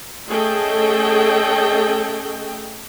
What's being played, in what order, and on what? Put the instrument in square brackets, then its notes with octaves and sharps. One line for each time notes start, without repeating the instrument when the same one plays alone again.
[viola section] A3 C#4 G#4 A4 D#5 G5